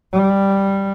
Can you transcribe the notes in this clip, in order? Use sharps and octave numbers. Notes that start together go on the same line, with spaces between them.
G3